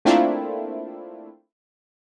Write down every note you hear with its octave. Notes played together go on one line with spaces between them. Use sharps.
A3 A#3 C4 D4 E4 F4